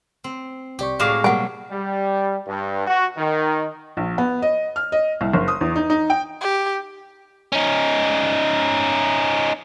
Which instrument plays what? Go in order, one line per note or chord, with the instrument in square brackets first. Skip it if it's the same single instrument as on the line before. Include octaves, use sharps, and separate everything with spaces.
[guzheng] C4
[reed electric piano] C2 D5 C#6 [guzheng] G4
[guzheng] A2 G#3 [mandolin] F#4 F5 D6
[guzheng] B2 F#3 [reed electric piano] G3 A#3 [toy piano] F#5 G#5
[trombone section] G3
G2
F#4
D#3
[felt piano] A#1
B3
D#5
F6
D#5
C2
F#1
D#6
E2
D#4
D#4
G5
[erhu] G4
[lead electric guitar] C#4 D#4